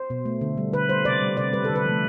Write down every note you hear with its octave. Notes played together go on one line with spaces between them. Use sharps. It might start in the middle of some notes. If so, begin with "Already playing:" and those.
Already playing: C5
B2
A3
D3
G3
D3 B4
G3 C5
C3 D5
G3
C3 D5
G3 B4
D3 A4
B4
F3 A3